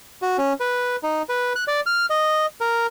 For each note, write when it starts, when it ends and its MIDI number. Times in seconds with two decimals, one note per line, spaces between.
0.22 0.37 66
0.38 0.53 61
0.60 0.96 71
1.03 1.22 63
1.29 1.53 71
1.56 1.64 90
1.68 1.81 74
1.86 2.06 89
2.10 2.46 75
2.61 2.87 70